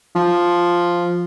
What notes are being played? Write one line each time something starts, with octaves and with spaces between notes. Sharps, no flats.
F3